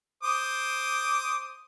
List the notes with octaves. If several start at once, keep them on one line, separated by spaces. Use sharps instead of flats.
C5 D6 D#6